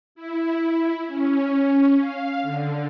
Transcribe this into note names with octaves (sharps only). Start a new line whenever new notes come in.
E4
C#4
F5
D3